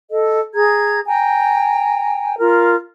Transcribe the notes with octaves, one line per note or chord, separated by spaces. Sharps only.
A4 D#5
G#4 A#5 G#6
G5 G#5 A#5
F4 A#4